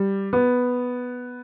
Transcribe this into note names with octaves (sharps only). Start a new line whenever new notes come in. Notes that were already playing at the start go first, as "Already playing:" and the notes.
Already playing: G3
B3